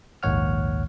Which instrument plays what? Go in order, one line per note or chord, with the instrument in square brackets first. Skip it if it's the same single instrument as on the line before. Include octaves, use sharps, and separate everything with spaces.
[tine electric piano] A#1 D#2 G#2 C#5 F#5 F6